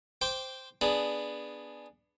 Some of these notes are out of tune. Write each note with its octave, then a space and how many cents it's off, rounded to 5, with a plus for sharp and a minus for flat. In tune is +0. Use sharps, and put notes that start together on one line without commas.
C5 +0 G5 +0 D6 -15
B3 +0 D4 +10 G#4 +0